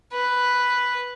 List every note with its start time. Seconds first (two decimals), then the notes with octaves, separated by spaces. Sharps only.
0.13 B4